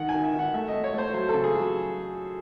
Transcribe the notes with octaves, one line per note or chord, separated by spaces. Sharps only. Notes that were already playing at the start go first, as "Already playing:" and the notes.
Already playing: D#3 F#5
G#5
D#3
E5
D#3
F#5
A3 E5
D#5
A3
C#5
A3 C5
F#3 C5
A4
C#3
G#4
F#3